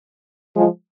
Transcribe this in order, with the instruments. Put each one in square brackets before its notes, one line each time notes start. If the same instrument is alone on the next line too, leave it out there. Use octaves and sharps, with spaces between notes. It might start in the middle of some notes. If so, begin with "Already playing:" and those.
[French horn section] F3 G#3